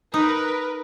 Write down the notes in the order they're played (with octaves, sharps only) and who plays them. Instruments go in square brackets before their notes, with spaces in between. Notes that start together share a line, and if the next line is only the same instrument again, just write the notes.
[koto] D#4 [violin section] A#4 B4